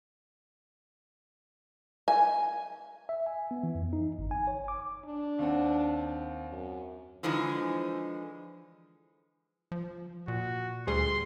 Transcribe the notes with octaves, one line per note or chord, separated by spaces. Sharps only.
G#5
E5
G#5
B3
E3
F2
D#4
G1
G#5
C#5
D6
D4
D#2 C4 F#5
F#2
D3 E3 F3 G#3 D#4
F3
A#2 F#4
D2 G3 G#4 C6